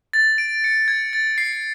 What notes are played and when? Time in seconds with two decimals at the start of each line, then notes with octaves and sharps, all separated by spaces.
0.13 A6
0.38 D7
0.64 C#7
0.88 G#6
1.13 A6
1.38 C7